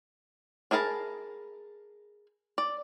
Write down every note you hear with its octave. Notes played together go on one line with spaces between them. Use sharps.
D4 G#4 A#4 A5 B5
D5